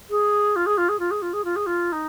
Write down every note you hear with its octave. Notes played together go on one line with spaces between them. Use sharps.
G#4
F4
G#4
F4
G#4
F4
G#4
F4
G#4
F4
G#4
F4
D#4